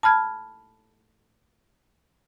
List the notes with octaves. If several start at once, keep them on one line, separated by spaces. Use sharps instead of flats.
A5 B5 F6 G#6